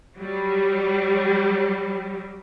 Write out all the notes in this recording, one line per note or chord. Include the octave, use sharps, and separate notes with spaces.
F#3 G3